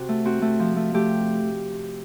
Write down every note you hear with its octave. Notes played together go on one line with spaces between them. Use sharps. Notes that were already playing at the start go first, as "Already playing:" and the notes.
Already playing: C3 F#4
A3
C4 F#4
A3
F3
A3
A3 G4